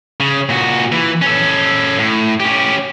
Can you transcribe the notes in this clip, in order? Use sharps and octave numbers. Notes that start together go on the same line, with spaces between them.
C#3
A#2 F#4
E3
C#4 A4
A2
C#4 G4